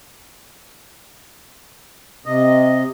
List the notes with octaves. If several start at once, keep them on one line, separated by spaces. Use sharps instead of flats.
C3 D#5